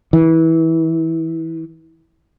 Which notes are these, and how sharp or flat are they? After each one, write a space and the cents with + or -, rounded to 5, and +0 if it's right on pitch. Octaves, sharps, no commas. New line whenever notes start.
E3 -20